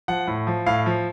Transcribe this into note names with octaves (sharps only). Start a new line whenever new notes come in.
F3 F#5
A2
F3
A2 F5
F3